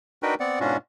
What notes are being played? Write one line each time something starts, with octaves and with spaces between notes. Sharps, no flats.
D4 D#4 F#4 A#4 B4 G5
B3 C4 D5 F#5
G#2 B2 C#4 D4 F4 F#4